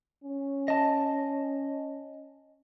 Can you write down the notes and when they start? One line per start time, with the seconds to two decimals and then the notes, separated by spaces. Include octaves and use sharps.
0.24 C#4
0.68 D#5 A5